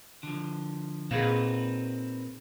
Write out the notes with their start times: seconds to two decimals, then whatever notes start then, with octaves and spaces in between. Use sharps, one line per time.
0.23 D3 F3
1.11 A#2 C4 D#4 G#4 B4 F5